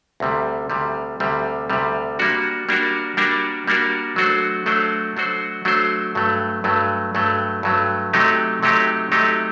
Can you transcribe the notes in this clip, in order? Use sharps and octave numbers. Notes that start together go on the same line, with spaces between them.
D2 C3 G3
D2 C3 G3
D2 C3 G3
D2 C3 G3
G3 A#3 D4 F#4 A#4
G3 A#3 D4 F#4 A#4
G3 A#3 D4 F#4 A#4
G3 A#3 D4 F#4 A#4
F#3 A3 D4 F#4 C5
F#3 A3 D4 F#4 C5
F#3 A3 D4 F#4 C5
F#3 A3 D4 F#4 C5
G2 F#3 A3
G2 F#3 A3
G2 F#3 A3
G2 F#3 A3
C3 F#3 A3 D#4 G4
C3 F#3 A3 D#4 G4
C3 F#3 A3 D#4 G4